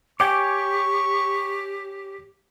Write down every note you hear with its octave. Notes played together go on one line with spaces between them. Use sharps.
G4 C#5 G5 G#5 C#6 D6